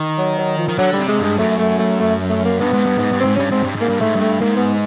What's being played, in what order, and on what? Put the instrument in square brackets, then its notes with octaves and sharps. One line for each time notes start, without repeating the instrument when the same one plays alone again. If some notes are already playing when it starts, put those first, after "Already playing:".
Already playing: [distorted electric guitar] D#3
[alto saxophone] F#3
F#3
F3
[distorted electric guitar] D#3
[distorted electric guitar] D3 [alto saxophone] F#3
[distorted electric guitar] C3 [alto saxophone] G3
[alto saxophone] G#3
[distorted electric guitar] G2 [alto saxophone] G#3
[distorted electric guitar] F#2 [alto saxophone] A3
[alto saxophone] A3
A3
A3
A3
A#3
[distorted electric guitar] G2 [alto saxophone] B3
[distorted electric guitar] G#2
G2
G#2
G2
[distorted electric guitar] G#2 [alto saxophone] C4
[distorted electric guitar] G2 [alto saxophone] C#4
[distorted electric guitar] G#2 [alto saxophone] C4
[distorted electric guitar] G2
[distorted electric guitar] G#2 [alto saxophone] A#3
[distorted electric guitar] G2
[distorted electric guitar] G#2 [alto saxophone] A3
[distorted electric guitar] G2 [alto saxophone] A3
[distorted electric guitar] G#2 [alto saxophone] A#3
[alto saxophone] B3